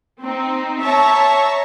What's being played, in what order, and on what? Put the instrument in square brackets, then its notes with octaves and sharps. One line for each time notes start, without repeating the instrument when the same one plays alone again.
[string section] C4 D#4
C#5 E5 A5 A#5 C#6